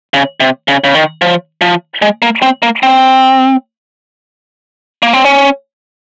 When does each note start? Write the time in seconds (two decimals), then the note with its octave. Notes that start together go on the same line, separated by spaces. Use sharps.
0.14 C#3
0.40 C3
0.68 C#3
0.84 C#3
0.95 D#3
1.22 F3
1.61 F3
2.02 G#3
2.22 A#3
2.42 C4
2.62 A#3
2.83 C4
5.03 A#3
5.13 C4
5.25 C#4